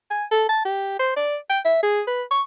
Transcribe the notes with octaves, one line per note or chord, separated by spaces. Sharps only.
G#5
A4
A5
G4
C5
D5
G5
E5
G#4
B4
C#6